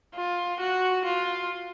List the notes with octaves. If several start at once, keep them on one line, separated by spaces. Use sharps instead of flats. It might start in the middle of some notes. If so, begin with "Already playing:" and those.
F4
F#4
F4